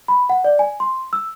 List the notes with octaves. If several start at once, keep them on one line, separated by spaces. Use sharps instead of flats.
B5
F#5
D5
G#5
C6
E6